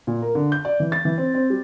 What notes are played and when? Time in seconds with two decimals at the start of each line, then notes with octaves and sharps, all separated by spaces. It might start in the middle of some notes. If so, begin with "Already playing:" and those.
0.07 A#2
0.22 A#4
0.35 D3
0.52 G6
0.65 D5
0.80 E3
0.92 A6
1.05 E3
1.18 C4
1.34 C4
1.50 G3